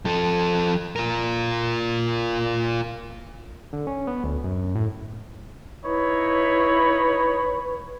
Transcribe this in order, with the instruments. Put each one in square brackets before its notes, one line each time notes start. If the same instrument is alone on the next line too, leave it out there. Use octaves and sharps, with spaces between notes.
[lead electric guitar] F3 A4
F4 A#4
[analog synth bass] D3
C#4
B3
D2
F#2
A2
[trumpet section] D#4 C#5 B5 [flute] E4 [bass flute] B4